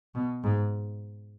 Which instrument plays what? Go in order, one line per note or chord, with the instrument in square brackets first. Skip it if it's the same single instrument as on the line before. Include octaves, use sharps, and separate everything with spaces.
[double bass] B2
G#2